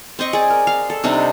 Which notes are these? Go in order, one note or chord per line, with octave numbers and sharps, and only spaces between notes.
C4 C5 D#5 C#6
G#4 D5
A#4
F5
A4
C3 G3 D4 D#4